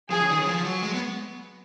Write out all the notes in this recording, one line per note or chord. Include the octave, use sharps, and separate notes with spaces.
F3 G#4
C#3
D#3
C#3
F3
F#3
G#3
B3